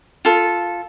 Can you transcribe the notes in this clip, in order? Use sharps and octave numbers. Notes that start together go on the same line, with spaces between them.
F4 A4